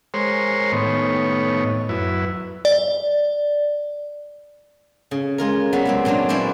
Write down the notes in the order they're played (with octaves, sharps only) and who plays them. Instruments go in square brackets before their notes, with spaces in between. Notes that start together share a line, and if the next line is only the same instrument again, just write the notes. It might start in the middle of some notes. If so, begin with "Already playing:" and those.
[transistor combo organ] G#3 A#4 C5 C#5 C6
A2 D#3 B3 C#5
F#2 E4 B4
[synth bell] D5
[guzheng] C#3
G#3 F4 A#4
F#3 G3 B3 F#4
C3 G#3 C4
A#2 F#3 C4 D4 F4
C#4 E4 F#4 C5 D5